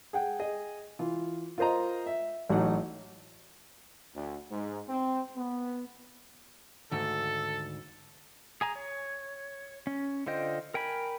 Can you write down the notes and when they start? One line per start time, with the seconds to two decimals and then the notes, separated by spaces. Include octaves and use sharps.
0.13 G#4 F#5 G5
0.39 G#4 D#5
0.99 E3 F4
1.58 F4 A#4 C5 D#5 A#5
2.06 E5
2.49 A1 F#3 A3 D#4 F#5
4.15 D2
4.50 G#2
4.89 C4
5.36 B3
6.92 D2 G#2 D#3 A4
8.61 G#4 G#5 A#5
8.76 C#5
9.87 C#4
10.27 D3 F4 C5 D#5 G5
10.74 A#4 G5 G#5 B5